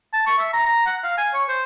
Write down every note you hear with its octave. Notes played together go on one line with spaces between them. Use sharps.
A5
C#6
E5
A#5
A#5
F#5
F5
G#5
C#5
C5